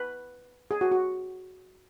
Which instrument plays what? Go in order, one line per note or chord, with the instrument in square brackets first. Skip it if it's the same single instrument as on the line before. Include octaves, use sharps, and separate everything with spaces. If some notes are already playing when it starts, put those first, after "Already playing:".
Already playing: [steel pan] B4
G#4
F#4
F#4